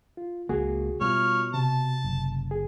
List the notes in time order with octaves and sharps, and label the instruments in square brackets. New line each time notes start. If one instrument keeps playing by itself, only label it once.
[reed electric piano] F4
[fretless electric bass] C#2 A#3 [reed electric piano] F#4 G#4
[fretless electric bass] B2 [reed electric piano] G3 F4 [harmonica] C#5 F6
[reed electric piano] C3 [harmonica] A5
[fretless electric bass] F#1
[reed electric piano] G#4